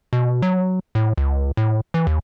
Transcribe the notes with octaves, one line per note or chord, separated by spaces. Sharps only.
B2
F#3
A2
C#2
A2
E3
D#2